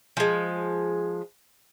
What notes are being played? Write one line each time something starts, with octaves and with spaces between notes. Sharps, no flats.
F3 G#3